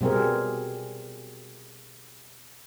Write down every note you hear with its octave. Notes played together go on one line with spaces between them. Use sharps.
B2 G3 C4 G#4 A#4